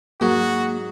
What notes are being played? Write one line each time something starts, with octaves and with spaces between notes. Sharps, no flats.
G#2 F#3 A#3 F#4